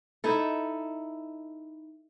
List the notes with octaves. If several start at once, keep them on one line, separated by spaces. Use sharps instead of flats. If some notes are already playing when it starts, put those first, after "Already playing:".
D#4 E4 A4